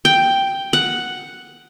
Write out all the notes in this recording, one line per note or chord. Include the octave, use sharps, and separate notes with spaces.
G5
F#5